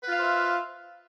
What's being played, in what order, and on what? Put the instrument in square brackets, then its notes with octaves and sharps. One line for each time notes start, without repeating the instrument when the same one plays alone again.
[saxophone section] B4
F4
F5
C5
E5